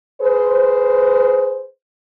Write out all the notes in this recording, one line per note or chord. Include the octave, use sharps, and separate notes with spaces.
G#4 B4 C5